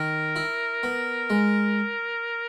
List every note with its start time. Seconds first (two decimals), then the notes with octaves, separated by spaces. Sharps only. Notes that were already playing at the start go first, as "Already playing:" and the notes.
Already playing: D#3 A#4
0.36 E4
0.83 B3
1.30 G#3